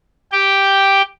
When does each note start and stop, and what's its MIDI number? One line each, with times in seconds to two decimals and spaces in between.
0.32 1.02 67
0.32 1.02 79